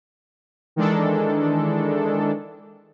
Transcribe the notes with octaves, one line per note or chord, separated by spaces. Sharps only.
D#3 E3 G#3 D4 A4